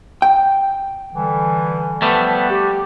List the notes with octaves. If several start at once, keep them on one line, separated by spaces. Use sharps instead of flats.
G5
D3 E3 G3
F3 G3 A3 B3 B4
G4